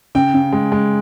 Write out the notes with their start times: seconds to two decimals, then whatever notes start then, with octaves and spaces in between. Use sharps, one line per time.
0.15 C#3 G5
0.34 C#3
0.53 G#3
0.72 G#3